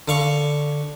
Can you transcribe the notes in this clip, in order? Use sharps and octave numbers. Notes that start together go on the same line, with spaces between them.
D3 F5 C#6